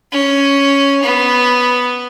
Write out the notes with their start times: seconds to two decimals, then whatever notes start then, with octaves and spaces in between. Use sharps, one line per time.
0.12 C#4
1.03 B3